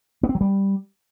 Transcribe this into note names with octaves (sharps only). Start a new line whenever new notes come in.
B3
C4
F#3
G3